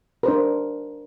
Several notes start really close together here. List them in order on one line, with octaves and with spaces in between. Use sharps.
A#4 C5 D4